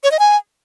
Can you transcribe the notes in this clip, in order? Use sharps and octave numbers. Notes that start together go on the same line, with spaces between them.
C#5
D#5
G#5